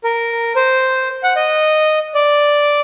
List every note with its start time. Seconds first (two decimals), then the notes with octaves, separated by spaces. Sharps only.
0.04 A#4
0.56 C5
1.23 F#5
1.36 D#5
2.15 D5